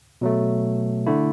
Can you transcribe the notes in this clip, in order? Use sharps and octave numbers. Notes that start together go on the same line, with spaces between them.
B2 F#3 A3
D3 A3 E4